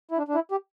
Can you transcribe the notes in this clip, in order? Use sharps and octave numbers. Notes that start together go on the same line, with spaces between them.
E4
D4
D4
E4
G4